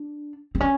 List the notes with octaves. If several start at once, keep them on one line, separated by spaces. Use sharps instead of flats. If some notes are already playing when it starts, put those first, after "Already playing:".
Already playing: D4
C4
C#4